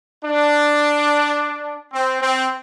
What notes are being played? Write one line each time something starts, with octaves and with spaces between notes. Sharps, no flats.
D4
C4
C4